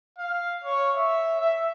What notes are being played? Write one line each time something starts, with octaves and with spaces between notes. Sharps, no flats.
F5
C#5
E5
E5